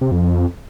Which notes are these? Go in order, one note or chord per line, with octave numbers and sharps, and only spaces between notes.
C3
F2
F2